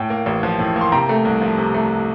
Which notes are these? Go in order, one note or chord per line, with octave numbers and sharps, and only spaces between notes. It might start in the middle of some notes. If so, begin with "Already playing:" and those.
Already playing: A2 G5
A#3
A1
F3
A2
A#3
C6
C3 G5 A#5
A3
C2
F3
C3
A3